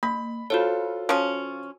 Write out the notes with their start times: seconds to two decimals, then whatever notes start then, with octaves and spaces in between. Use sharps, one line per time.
0.03 A#3 B5
0.50 F4 F#4 A4 C5 C#5
1.09 F3 C#4